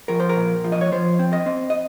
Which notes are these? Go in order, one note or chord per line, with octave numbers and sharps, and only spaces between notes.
F3 A#4
C5
A#4
A#2
F3
D#5
C#5
F3 C5
C4
D#5
C4
D#5